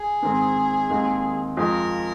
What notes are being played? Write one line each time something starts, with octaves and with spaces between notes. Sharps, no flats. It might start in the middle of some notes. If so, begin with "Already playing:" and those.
Already playing: G#4
G#2 D#3 G#3 C4
D#2 D#3 G#3 C4
F2 F3 G#3 A#4